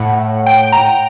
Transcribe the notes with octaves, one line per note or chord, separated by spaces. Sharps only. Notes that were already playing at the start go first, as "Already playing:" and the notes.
Already playing: A2 F#5
G5
A#5